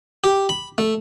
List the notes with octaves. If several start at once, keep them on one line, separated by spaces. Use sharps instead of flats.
G4
B5
A3